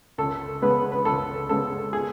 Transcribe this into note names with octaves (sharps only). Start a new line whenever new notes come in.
C#2 A4
C#3 G#3 B3 B4
B4
C#2 A4
C#3 G#3 B3 A4
G#4